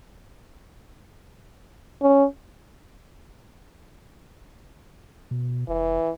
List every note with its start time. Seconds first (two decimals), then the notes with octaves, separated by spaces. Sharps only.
2.02 C#4
5.31 B2
5.68 F1 E3